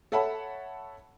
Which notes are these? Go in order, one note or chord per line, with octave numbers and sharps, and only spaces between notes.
A4 C#5 E5 F#5 A5 B5